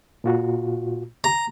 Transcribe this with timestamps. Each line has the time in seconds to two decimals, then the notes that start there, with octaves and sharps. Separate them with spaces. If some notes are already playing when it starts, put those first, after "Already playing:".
0.24 A#2 F4 F#4
1.24 A#5